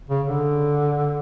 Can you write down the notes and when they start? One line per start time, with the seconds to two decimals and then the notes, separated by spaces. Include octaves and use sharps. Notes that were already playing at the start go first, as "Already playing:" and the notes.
0.10 C#3
0.26 D3